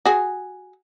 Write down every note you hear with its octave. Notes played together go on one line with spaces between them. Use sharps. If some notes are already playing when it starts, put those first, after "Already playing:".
F#4 G#4